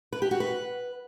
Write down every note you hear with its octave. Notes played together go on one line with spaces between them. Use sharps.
B4
G4
F#4
B4